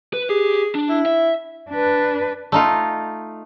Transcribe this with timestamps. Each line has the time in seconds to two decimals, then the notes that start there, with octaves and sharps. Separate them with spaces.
0.13 B4
0.29 G4 G#4
0.75 D4
0.89 E4
1.06 E5
1.70 D4 B4
2.52 A3 D#4 F4